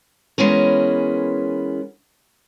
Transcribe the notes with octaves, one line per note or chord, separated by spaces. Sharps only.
E3 G#3 B3 C#4 A#4